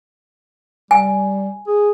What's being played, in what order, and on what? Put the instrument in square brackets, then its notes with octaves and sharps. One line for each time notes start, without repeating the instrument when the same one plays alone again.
[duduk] G3 [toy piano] G#5
[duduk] G#4